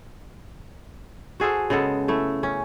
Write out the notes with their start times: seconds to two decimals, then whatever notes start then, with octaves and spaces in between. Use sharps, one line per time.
1.40 F#4 G#4 A4 C5
1.70 C#3 G#3 B3 A4
2.08 A3 E4
2.43 C#4